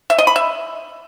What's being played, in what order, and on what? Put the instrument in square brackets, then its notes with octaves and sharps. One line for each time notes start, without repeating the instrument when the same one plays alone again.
[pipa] E5
D#5
B5
E5